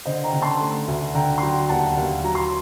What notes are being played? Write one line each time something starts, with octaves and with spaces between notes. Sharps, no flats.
D3 C5 D#5
G5 A#5
D3
A5 C6
A3
D2
D3 G5 A#5
C6
F#3 G5 A#5
D#2 F#5 A5
D#2
F#3 A#5
C6